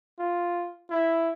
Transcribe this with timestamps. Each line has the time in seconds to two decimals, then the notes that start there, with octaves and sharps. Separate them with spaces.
0.19 F4
0.91 E4